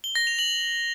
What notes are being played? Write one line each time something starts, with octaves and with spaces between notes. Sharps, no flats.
G7
A#6
F7
F#7